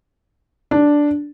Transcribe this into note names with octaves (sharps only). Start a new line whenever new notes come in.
D4